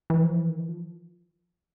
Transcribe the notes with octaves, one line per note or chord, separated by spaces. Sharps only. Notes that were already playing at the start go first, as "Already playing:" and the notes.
E3
F3
E3
D#3
E3
F3